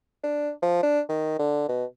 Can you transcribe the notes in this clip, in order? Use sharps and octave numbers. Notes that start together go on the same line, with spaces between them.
D4
F3
D4
D#3
D3
B2